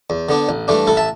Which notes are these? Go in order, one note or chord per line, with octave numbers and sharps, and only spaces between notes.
E2
D3 B3 D4
A1
G2 E3 A3 D4
A1 E4 A4
E5 A5